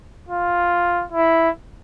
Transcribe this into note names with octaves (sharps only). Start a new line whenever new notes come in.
F4
E4